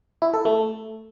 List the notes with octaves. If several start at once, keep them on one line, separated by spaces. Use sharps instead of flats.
E4
A4
A3